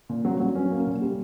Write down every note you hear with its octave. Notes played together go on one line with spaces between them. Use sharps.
A#2
F#3
F#3
C#4
A#3
A#2
G3